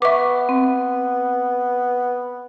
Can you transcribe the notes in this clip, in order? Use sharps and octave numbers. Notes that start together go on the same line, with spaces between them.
B3 B4 E5 C#6 D6
C4